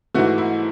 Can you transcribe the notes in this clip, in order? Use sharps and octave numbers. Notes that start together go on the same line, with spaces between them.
G#2 E3 A3 F#4
E4